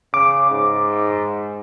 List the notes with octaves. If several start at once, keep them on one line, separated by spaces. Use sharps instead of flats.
C#3 D6
G#2